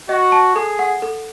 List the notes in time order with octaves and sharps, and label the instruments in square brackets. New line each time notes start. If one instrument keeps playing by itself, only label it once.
[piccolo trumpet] F#4 [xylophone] D#5
[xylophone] A5
[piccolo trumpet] G#4 [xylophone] A4
[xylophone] F#5
A4